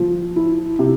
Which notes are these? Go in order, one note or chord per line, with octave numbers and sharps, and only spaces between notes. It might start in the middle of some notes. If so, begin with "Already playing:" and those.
Already playing: F3
E4
C3